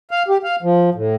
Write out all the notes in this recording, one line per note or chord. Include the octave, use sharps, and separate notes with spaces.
F5
G4
F5
F3
A2